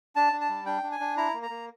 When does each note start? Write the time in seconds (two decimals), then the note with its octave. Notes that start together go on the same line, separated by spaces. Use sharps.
0.16 D4 A5
0.33 D4
0.41 A5
0.49 G3
0.66 D4 G5
0.83 D4
0.92 G#5
1.00 D4
1.17 E4 A#5
1.34 A#3
1.43 A#5
1.50 A#3